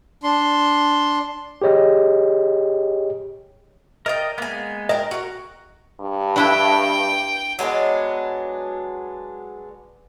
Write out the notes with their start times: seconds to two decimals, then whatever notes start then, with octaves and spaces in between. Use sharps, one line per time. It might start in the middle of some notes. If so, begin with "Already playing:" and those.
0.23 D4 C6
1.62 G4 G#4 C#5 D#5
4.06 A#4 D5 D#5 G5 D#6
4.38 G#3 A#3 B3 G#5
4.89 A#4 D#5 G5
5.11 F#4 A#4
6.00 G2
6.36 D4 E4 B4 G5
7.59 F#3 G#3 B3 D4